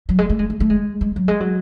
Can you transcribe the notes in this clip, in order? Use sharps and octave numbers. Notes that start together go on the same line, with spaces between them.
F#3
G#3
A3
G#3
A3
A3
G#3
G#3
F#3
G#3
F#3